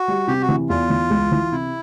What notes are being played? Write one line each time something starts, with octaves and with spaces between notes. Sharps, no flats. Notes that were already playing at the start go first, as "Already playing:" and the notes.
Already playing: F#4
G3
C3 G4
F#4
E3
E2 F4
E3
C#2
E3
C3 E4